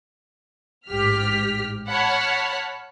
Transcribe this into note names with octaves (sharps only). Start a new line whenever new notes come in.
A1 G#2 G4 F6 B6
C#5 F#5 A5 B5 F6